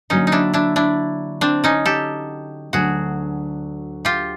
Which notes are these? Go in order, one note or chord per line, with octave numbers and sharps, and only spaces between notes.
D3 F#3 A#3 C#4 D#4
D#4
D4 E4
D4 E4
D4 E4
C4 D4
C#4 D#4
G4 A4
D2 D3 F#3 F#4 G#4
F4 G4